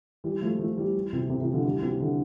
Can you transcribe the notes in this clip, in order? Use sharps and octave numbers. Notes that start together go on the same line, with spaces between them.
E3 G3
F3 A3
F3 A3
E3 G3
C3 E3
C3
C3 E3
D3 F3
E3 G3
C3 E3
D3